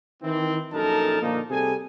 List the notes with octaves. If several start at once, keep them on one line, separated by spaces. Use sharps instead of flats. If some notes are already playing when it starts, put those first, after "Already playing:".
D#3 E3 C4
A#1 F#2 D#4 A4 A#4 A5
A#2 D3 F3 A#3 D#4
C3 G3 G#4 A4 G#5